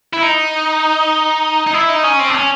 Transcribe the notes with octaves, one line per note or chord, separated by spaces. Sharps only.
E4
D#4
D#4
E4
D#4
C#4
C4
D4
C#4